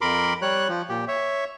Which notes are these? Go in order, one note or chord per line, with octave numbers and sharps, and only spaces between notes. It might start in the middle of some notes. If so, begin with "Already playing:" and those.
F2 A#4 B5 C6 D6
G3 C#5 F#6
F3
A#2 G4
C#5 E5